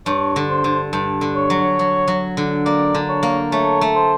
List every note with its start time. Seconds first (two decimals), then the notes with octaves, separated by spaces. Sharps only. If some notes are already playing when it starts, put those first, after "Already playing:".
0.06 G2 C#5
0.36 D3
0.50 C5
0.64 D3
0.93 G2
1.21 D3
1.36 C#5
1.50 F#3
1.79 F#3
2.08 F#3
2.37 D3
2.66 A#3 D5
2.94 D3
3.09 C#5
3.23 A#3
3.52 A3 C#5
3.81 A3
3.95 C5